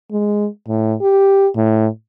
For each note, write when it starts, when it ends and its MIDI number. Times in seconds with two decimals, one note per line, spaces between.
0.12 0.47 56
0.68 0.94 45
1.01 1.48 67
1.56 1.87 45